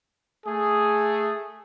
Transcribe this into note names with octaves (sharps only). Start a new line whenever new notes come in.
A3 G#4